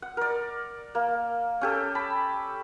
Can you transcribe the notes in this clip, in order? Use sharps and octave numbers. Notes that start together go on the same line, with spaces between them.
F#5
A#4 D5
A#3
C#4 G4 A4
A5 B5